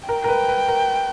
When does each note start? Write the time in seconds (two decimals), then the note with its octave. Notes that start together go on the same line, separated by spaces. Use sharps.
0.08 A#4 G5
0.24 A#4
0.28 B4
0.48 B4
0.68 A#4